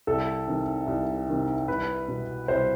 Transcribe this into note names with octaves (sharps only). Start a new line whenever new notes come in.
C2 A4
C3 D#3
C2
C3 D#3
C2 B4
B2
C2 C5